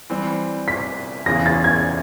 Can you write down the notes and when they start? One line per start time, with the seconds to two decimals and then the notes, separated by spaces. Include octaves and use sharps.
0.10 E3 G3 C4
0.68 B6
1.26 E2 C#3 E3 A#6
1.46 A6
1.64 G#6